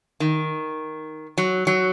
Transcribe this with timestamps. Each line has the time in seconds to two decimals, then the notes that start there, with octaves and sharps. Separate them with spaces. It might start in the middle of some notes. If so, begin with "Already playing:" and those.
0.20 D#3
1.38 F#3
1.67 F#3